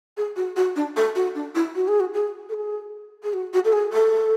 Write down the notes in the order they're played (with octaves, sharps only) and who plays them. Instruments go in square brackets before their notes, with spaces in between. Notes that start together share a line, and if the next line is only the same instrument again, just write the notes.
[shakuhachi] G#4
F#4
F#4
D4
A4
F#4
D4
E4
F#4
G#4
F#4
G#4
A4
G#4
G#4
F#4
F#4
A4
G#4
A4